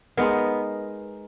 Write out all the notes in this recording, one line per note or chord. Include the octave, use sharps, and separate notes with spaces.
G#3 B3 D#4 A#4